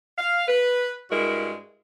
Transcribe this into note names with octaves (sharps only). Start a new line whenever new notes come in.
F5
B4
G2 G#3 E4 F#4 A#4